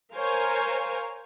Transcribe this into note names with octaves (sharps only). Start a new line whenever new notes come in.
A#4 C5 C#5 F5 G#5 A#5